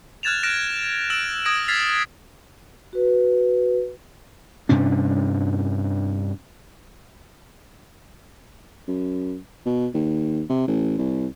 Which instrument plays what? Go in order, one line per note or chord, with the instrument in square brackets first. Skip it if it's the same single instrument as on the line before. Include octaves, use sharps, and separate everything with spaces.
[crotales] F6 F#6 G#6 A6 E7 F7
F6 F#6 A#6 D7 E7
E6 D7 E7 F#7
D#6 G#6 A#6 D7
F6 G#6 A6 B6 C7 F7
[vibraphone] F#4 B4
[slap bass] G2 C3 C#4 D4
[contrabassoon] F#2
B2
D#2
C3
A1
C2